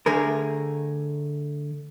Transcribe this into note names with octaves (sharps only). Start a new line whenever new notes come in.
D3 A3 G#4 A#4